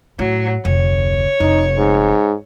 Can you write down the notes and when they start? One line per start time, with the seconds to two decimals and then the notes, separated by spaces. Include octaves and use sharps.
0.19 A2 F#3
0.65 F1 D2 C#5
1.40 F1 D#4
1.77 G#2